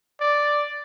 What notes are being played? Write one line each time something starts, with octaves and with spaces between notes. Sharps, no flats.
D5